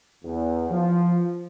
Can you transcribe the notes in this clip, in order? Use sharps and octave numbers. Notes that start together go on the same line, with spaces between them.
E2
F3